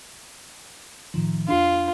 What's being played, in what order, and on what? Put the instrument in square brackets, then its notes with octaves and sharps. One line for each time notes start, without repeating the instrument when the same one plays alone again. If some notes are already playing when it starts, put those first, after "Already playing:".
[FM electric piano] A2 D#3 F3
[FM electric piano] F2 D4 [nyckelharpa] F4